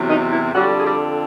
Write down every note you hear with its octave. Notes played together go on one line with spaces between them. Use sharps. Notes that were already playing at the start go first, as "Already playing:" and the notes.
Already playing: E2 C3 F#3
D#3 D#4
E3 E4
F2 D3 F#3 G3 F#4
G#4
G3 G4